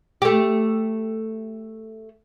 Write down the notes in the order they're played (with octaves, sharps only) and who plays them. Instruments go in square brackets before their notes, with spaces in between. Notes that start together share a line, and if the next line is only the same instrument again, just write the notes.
[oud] A3 G4